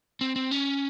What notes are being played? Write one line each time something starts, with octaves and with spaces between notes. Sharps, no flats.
C4
C4
C#4